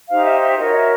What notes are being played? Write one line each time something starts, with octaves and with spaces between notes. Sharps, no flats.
D#4 G4 C5 F5
E5
E5
F#4 A#4 C#5 D#5
E5